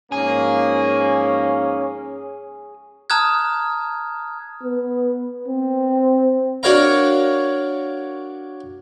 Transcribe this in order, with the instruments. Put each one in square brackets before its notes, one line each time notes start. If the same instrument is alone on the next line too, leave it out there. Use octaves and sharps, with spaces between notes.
[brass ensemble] G#2 F3 A#3 [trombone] C#4 [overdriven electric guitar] G#4
[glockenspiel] A5 A#5 D#6 F6 F#6 G#6
[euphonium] B3
C4
[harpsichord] D4 F#4 A#4 C#5 F5 A#5